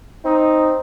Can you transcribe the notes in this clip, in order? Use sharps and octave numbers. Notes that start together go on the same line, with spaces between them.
C4 D#4